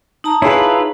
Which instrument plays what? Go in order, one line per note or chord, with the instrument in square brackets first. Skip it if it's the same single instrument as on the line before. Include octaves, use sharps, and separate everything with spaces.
[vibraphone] D#4 A5 A#5
[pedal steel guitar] E4 F4 B4 [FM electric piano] G#4 C#5